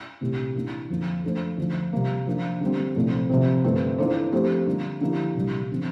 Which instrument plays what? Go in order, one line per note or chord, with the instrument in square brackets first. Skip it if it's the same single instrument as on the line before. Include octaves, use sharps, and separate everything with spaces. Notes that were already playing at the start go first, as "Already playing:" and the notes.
[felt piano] C2 A#2 A3 C4 G4
E3 A#3 D4
F2 D3 F3 A#3
F3 A3 D4 A4 C5
D2 D3 F3
C3 G3 A#3
F3 A#3 D4
D3 G3 C4
C2 A#2 F3 A3 C4
C3 F3 C4
G2 D3 A3 C4 F4
E3 A#3 D4 A4 C5
F3 A3 C4 G4 C5
D3 G3 A#3 D4
D3 F3 A#3 E4 G4
C2 A#2 G3
D3 F3 C4